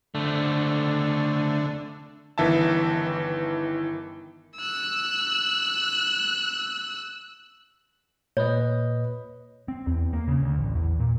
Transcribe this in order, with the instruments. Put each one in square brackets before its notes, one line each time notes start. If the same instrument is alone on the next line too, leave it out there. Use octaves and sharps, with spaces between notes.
[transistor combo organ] D3 [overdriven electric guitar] A3 C4
[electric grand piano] G1 D#3 E3 E5 A5
[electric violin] E6 F#6
[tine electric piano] A#2 B4 D#5 [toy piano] C#5
[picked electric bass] C4
E2
A#3
C#3
D2
A1
E2
A#2